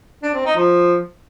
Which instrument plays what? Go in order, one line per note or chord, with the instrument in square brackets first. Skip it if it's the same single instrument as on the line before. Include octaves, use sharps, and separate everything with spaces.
[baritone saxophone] D4
C4
D#4
F3